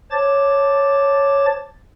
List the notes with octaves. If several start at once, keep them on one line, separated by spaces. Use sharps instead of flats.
C5 C#5 A5 D6 A6